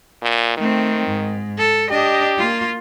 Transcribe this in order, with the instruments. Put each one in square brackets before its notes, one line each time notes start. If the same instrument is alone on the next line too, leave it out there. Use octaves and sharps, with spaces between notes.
[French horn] A#2
[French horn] D#3 [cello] A3 C4
[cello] G#2
A4
[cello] D4 D#5 [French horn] G4
[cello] A#3 F4